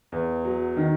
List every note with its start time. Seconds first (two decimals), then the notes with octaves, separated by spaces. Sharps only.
0.12 E2
0.45 F#3
0.77 D#3